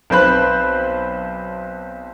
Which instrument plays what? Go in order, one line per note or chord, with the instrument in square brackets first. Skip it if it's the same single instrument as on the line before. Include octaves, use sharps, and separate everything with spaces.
[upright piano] B1 C4 B4 C5 B5 F#6